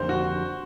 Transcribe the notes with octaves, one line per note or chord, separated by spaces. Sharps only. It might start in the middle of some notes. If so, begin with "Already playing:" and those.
Already playing: F2 D3 G3 A#3 D#4 C5
F#4